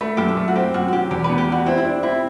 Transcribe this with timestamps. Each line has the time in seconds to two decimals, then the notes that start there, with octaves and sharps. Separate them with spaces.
0.01 A3 B4
0.17 F#2 G4
0.28 A4
0.37 A3
0.48 F#4
0.56 C4 G4
0.74 F#2 F#4
0.88 F#4
0.93 F#3 G4
1.11 E2 G4
1.24 B4
1.30 B3
1.38 G4
1.48 G3 F#4
1.66 C4 E4
1.78 E4
1.84 C4 D4
2.03 C4 E4